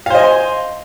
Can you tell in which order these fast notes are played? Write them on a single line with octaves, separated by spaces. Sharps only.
F5 C5 D#5 G#5 C6